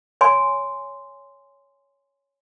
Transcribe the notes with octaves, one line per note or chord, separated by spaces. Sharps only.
C#5 G#5 C6